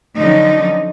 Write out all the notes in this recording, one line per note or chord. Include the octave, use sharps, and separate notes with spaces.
D3 F3 F#3 C#4 D#4